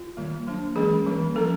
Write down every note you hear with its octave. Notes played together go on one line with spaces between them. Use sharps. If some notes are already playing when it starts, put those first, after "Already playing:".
Already playing: F4
D#3 G3 A#3
F#3 A#3 D4
E3 G#3 C#4 G#4
E3 G3 A#3
F3 A#3 C#4 A4